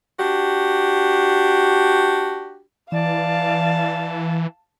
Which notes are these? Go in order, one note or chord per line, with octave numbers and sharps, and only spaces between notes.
D4 F#4 G4
E3 D5 F5 A5